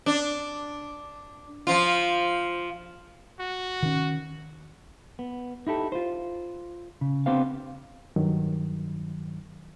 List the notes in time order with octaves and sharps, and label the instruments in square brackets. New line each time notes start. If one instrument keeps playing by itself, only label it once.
[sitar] D4
F3 F4
[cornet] F#4
[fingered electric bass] D#3 C#4
[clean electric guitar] B3
D#4 E4 G4 A4
F4 C5
C#3
B3 C4 D4 G4 C5 F5
[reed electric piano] G2 D#3 F#3